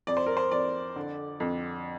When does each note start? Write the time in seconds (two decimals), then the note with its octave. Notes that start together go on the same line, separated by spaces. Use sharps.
0.07 F2 D5
0.17 C5
0.26 A#4
0.37 C5
0.51 F2 D5
0.96 D3
1.40 F2